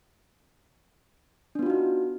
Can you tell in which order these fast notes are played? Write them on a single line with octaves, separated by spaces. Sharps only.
D4 B3 F4 F#4 D#4